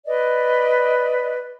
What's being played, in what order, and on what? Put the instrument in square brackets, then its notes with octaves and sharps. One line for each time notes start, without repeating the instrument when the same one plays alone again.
[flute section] B4 D5 D#5